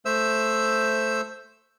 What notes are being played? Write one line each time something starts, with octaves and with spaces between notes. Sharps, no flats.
A3 C5 E5 E6